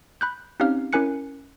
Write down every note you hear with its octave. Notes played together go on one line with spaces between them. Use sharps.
B5 F#6 G6
C4 C#4 D#4 G4 F5 F6
C#4 E4 A#4 G#5 F#6 C#7